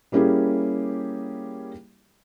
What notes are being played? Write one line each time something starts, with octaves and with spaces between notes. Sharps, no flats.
G3 A#3 C#4 E4 G4 G#4